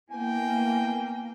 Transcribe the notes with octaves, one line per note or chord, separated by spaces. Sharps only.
A#3 B3 E4 G5 G#5